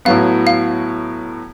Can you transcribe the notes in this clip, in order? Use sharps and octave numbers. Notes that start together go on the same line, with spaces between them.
A2 F#3 B3 F5
F5